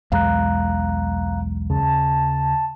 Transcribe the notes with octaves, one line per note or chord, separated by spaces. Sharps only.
B1 E2 G#3 F5 A#5 F#6
D#2 C#3 A5